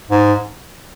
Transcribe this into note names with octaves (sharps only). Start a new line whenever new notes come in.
G#2